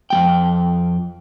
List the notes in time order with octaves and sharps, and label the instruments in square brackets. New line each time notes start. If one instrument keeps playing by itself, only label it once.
[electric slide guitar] F2 G#3 G5